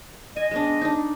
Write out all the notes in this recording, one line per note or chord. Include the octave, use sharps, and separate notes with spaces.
D#5 G#5
G#3 B3 D4
D4 D#4